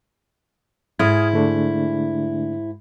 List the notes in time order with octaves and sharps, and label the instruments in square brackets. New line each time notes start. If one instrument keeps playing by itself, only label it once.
[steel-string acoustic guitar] G#2 E4 [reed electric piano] D#6 F6 G#6
[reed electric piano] D3 A3 D4